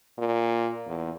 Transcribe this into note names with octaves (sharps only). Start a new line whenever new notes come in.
A#2
E2